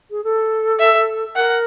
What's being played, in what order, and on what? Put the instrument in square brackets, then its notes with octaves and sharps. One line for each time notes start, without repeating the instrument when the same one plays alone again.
[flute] G#4
A4
[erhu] E5
[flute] A#4 [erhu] F#5